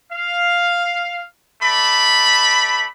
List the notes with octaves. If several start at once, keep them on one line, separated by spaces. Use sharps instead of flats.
F5
A3 D5 B5